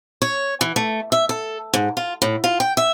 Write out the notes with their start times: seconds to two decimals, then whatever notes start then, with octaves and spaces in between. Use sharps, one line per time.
0.22 C#5
0.61 E3
0.76 A3
1.12 E5
1.29 A4
1.74 G#2
1.97 F4
2.22 A2
2.44 F4
2.60 G5
2.77 E5